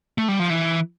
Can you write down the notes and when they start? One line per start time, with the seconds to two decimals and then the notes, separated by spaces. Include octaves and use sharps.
0.18 A3
0.28 G3
0.40 F3
0.50 E3